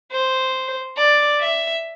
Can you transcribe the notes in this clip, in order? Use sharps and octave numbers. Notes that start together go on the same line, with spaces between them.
C5
D5
E5